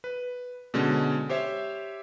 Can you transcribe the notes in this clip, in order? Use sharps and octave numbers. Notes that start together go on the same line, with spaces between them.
B4
B2 D3 G#3 C#4
G4 C5 C#5 E5